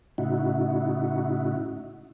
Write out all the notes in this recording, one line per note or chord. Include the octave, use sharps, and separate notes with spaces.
A2 C#3 D#4 E4 F#4